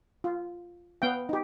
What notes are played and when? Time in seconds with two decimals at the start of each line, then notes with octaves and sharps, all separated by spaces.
0.24 F4
1.02 B3 F5 G5
1.29 D#4 G4